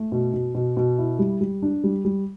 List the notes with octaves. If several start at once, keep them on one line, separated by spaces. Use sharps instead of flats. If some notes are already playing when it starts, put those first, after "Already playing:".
Already playing: A3
B2
B2
B2
B2
E4
G3
G3
D4
G3
G3